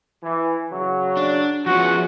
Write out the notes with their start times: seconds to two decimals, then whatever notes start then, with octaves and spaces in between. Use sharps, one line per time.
0.22 E3
0.72 C#3 F#3
1.17 D4
1.66 E2 F3 C#4 F#4